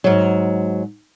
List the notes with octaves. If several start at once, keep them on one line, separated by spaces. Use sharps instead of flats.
G#2 F#3